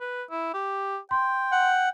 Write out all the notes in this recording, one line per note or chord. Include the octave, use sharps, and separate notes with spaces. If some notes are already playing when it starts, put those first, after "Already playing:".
B4
E4
G4
G5 C6
F#5